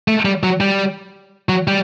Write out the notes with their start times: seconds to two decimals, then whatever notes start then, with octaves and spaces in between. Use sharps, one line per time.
0.08 A3
0.25 G3
0.43 F#3
0.61 G3
1.49 F#3
1.68 G3